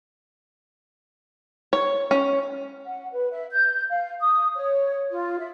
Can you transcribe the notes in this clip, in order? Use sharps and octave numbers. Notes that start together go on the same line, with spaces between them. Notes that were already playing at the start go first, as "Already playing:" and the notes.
C#5
C#4
F#5
B4
E5
G6
F5
D#6
C#5
F4
E5